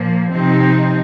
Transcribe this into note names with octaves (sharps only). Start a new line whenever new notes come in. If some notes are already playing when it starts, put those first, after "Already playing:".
Already playing: A#2 F3 A#3
C3 F3 C4 D#4